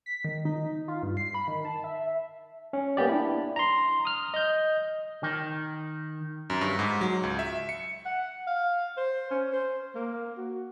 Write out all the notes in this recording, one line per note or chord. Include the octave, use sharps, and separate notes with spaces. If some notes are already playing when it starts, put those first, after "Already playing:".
B6
D#3
D#4
F4
G2
C7
B5
D#3
A5
E5
C#4
A#3 B3 G4 D5
D4 E4
A#5 C6
D#6 F6
D#5 G6
D#3
F#2
G2
G#2
F#3
C#2
E5
C#7
F#5
F5
C5
C#4
C5
A#3
F#4